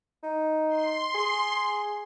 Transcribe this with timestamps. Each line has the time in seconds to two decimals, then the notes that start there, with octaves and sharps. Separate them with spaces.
0.24 D#4
0.67 C6
1.15 G#4